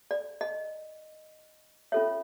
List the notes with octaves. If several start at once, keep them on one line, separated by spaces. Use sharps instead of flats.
D5
D#5
C#4 F4 A4 C#5 E5